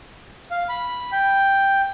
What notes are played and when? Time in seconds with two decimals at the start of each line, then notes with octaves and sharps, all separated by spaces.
0.51 F5
0.69 B5
1.12 G5